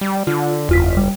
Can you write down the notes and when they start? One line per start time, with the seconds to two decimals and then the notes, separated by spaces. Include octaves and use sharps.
0.01 G3
0.27 D3 F4
0.69 F#1 E2 F4 B6
0.97 G3